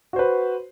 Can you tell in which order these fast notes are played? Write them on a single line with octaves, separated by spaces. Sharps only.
F#4 C5 B4